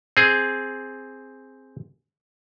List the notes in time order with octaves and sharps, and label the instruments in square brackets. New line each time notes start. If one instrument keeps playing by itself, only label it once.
[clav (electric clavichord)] C4 G#4